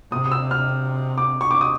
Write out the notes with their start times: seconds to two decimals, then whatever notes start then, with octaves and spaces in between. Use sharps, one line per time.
0.12 C3 D#6
0.26 D#6
0.32 E6
0.51 F6
1.18 D6
1.41 C#6
1.51 D6
1.61 D#6